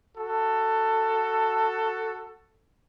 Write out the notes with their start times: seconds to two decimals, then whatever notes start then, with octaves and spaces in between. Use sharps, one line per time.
0.17 F#4 A4